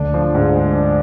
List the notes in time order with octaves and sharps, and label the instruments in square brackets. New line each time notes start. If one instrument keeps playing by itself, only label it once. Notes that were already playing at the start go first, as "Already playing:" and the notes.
Already playing: [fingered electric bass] D2 D3 [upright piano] D4
[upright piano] F3
G#2
G#3
D4